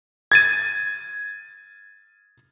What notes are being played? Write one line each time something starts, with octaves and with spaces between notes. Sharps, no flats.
G#6 A6 D#7